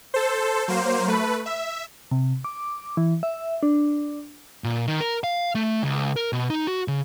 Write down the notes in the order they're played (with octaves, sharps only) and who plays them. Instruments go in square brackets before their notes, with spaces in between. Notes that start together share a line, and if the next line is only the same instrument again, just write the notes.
[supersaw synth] A4 C5
F#3 A#3 C5
A3 B4
E5
[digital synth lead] C3
D6
E3
E5
D4
[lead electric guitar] A#2
D#3
A#4
F5
A3
C#2
A#4
B2
D#4
F#4
C#3